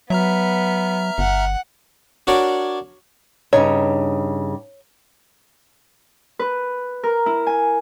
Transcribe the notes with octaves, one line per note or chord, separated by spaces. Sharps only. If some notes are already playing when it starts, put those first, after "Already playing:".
F#3 B3 E5 A#5 F6
G1 F#5
D4 F#4 A#4 C#5 D5
G2 C#3 D#4 C#5
B4
A#4
E4
G#5